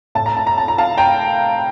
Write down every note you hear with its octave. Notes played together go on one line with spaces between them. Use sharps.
A2 A5
A#5
A5
A#5
A5
A#5
F5 A5
G5 A#5